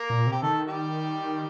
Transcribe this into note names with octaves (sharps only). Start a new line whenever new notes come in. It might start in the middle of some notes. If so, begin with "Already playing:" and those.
Already playing: A#3 A#4
A#2
C3
G4
D#3 A3 A4
G3 G4